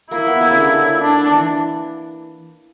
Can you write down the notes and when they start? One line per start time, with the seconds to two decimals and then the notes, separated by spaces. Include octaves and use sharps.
0.11 A#3 E4
0.27 B3
0.41 A#3
0.51 C#3
0.56 D3
1.01 D4
1.32 E3